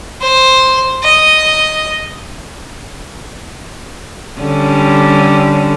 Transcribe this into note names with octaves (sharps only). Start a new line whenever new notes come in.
C5
D#5
D3 G3 C#4